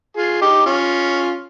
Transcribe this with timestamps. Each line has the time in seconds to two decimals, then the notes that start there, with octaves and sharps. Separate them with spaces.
0.17 F4 G#4
0.41 D#4 G4
0.66 C#4 F4